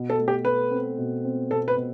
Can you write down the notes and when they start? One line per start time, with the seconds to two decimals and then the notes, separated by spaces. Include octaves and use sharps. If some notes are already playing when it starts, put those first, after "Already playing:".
Already playing: B2
0.10 A4
0.19 A3
0.28 G4
0.45 A3 B4
0.71 C4
0.98 B2
1.24 C4
1.50 B2 A4
1.68 B4
1.77 B2